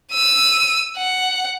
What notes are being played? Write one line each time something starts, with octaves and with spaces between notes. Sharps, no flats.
E6 D#7
F#5